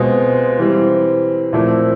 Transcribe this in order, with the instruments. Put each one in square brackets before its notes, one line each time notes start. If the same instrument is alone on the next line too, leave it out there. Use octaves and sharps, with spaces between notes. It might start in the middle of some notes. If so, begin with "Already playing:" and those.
Already playing: [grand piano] B2 G#3 C4 F4
E3 G3 C4
A#2 F3 A3 C4 E4